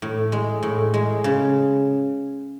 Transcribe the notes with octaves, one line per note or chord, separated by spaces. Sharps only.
A2
G#3
A2
G#3
C#3